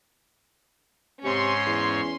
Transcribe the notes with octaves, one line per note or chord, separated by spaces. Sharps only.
G#2 C3 C#4 C#5 C6
E2